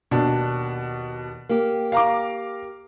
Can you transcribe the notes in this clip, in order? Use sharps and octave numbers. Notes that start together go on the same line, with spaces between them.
D#2 B2 D4
A#3 G4
F5 A#5 D6